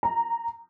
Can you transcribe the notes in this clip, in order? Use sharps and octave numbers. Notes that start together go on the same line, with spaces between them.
A#5